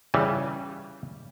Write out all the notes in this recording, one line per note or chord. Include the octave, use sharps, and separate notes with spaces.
C#3 E3 G3